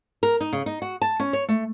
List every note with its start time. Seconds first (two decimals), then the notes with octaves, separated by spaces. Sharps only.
0.23 A#4
0.40 D#4
0.53 C#3
0.66 D#4
0.82 F#4
1.02 A5
1.20 C#4
1.33 C#5
1.49 A3